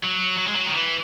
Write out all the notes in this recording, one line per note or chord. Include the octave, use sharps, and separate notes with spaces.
F#3
F#3
G#3
F#3
D#3
E3